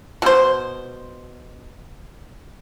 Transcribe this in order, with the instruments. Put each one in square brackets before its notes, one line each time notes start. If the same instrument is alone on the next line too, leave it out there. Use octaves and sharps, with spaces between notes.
[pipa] B2 C5